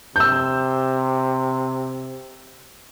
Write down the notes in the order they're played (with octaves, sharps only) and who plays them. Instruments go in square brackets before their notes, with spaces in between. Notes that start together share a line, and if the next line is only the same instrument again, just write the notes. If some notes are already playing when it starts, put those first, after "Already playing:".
[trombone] C3 [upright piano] E6 G6